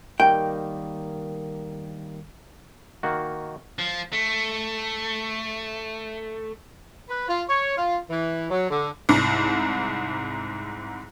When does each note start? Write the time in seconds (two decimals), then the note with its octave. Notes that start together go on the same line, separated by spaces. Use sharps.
0.20 D#3 G3 A#3 G5
3.03 D#3 A#3 F#4
3.79 F3
4.13 A3
7.08 B4
7.28 F4
7.48 C#5
7.75 F4
8.10 E3
8.50 F#3
8.70 D3
9.09 C2 G#2